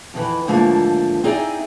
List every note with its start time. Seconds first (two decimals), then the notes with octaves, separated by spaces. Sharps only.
0.14 F2 D#3 E3
0.47 D#2 G#2 D3 F3 A3 A#3
1.23 C4 D#4 E4 G#4 D5 G5